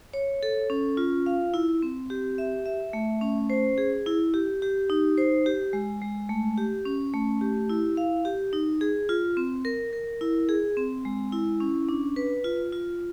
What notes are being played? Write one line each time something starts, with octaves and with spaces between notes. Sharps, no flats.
C#5
A4
C#4
F4
F5
E4
C4
G4
E5
E5
A3
C#4
C5
G#4
E4
G4
G4
D#4
C5
G4
G#3
G#3
A3
G4
C#4
A3
G4
E4
F5
G4
D#4
G#4
F4
C4
A#4
A#4
E4
G#4
C4
G#3
E4
C#4
D4
B4
F4
F4